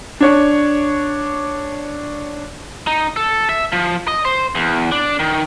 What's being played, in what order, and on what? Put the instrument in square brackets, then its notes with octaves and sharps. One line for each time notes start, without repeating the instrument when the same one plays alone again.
[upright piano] D4 C#5 D5
[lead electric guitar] D#4
A4
E5
F3
D#5
C5
E2
D4
D#3